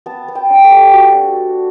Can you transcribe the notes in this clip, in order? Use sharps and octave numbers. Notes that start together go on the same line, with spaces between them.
B3 A5
B3
G5
D4
A4
G3
G3 F#4
D4